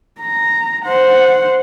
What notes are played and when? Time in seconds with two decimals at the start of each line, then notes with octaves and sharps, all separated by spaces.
0.20 A#5
0.85 C5 F#5